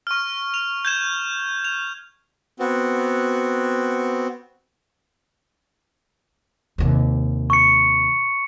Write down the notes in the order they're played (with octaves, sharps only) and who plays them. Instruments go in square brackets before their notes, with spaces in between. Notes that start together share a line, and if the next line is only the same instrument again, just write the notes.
[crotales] C#6 F6
F7
G6 G#6 E7
F7
[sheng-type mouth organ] B3 C4 F#4
[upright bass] D#2 C3
[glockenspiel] C#6 C#7